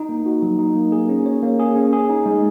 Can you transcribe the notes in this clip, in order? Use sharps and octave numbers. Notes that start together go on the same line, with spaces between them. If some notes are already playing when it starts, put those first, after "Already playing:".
Already playing: D#4
A#3
F#4
F#3
D#4
A#3
G#4
C#4
C#5
A#3
G#4
C#4
G#4
D#4
G#3